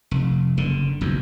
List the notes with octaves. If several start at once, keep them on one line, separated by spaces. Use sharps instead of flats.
F1
F#1 D3
F#1 B1 E2